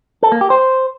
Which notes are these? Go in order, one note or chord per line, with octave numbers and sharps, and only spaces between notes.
A4
A#3
G4
C5